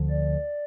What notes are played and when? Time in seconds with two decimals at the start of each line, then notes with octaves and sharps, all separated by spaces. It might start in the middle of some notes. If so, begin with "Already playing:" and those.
Already playing: D2 D3 F3
0.10 D5